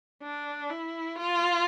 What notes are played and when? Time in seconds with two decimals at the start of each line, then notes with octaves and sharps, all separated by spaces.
0.23 D4
0.70 E4
1.16 F4